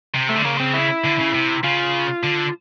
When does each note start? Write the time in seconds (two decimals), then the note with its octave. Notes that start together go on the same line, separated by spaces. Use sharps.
0.14 C3
0.29 A3
0.36 D3
0.45 C#3 A#3
0.60 C4
0.74 E4
1.05 D3
1.20 C#3
1.34 C3
1.64 C#3 F4
2.24 D3